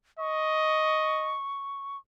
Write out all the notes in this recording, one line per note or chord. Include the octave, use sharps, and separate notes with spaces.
D#5 C#6